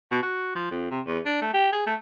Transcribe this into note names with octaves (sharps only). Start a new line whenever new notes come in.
B2
F#4
F3
F2
C3
E2
D4
A3
G4
G#4
A3